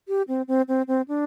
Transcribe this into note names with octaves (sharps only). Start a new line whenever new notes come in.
G4
C4
C4
C4
C4
D4